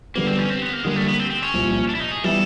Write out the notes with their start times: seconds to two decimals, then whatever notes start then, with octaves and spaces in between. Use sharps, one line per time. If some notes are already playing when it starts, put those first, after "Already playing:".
0.15 D3 G3 A#3 B3
0.27 C4
0.39 C#4
0.50 C4
0.62 B3
0.73 A#3
0.84 D3 G3 G#3 A#3
0.96 A3
1.08 B3
1.19 C4
1.30 C4
1.42 C#4
1.54 C2 A#2 F3
1.89 D4
1.95 E4
2.00 D#4
2.12 G#4
2.24 E3 G3 B3 E4 A4